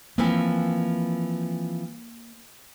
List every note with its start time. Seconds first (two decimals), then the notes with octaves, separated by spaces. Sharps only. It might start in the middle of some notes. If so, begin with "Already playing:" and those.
0.18 E3 F3 A#3 C4